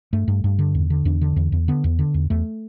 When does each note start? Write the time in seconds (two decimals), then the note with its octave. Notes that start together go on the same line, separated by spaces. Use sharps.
0.13 G2 A3
0.28 G2
0.44 G2
0.59 D3
0.75 E2
0.90 D3
1.05 E2 D4
1.21 D3
1.36 E2
1.52 E2
1.68 D3 B3
1.84 E2
1.99 D3
2.14 E2
2.30 E2 A3